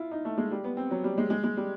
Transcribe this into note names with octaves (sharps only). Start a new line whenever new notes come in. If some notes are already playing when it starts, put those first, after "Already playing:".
Already playing: E4 F4
D#4
A3
G#3
G3
B3
C4
F#3
G3
G#3
G#3
G#3
G3